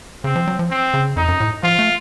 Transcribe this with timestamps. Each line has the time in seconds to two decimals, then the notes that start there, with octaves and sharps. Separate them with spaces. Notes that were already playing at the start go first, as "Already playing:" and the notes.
0.24 C#3 C4
0.36 F3
0.47 F#3
0.59 F3
0.71 C4
0.94 C#3
1.16 F2 D#4
1.28 F#2
1.40 A2
1.63 F3 F4
1.79 A3